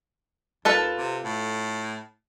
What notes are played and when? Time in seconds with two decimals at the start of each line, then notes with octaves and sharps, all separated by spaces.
0.65 D#2 F4 A4 B4
0.97 C3
1.24 A2